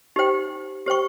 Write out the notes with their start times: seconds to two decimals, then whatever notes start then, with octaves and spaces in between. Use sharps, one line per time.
0.16 D#4 G4 C5 G5
0.86 G4 C5 G5 C#6